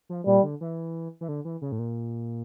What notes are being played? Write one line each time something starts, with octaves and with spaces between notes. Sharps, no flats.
F3
A#2 G3
D3
E3
E3
D3
E3
C#3
A2
A#2